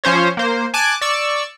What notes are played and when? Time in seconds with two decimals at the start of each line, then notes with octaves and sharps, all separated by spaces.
0.04 F3 C#4 C5 C#5
0.37 A#3 C5
0.74 G#5 A5 D6 F#6
1.01 D5 C#6 E6